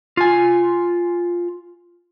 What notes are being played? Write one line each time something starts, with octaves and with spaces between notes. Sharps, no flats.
F4 G#5